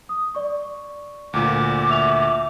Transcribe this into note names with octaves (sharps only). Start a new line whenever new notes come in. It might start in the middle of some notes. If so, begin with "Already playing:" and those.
D#6
D5 C#6
D2 A#2 D6
E5 E6 F7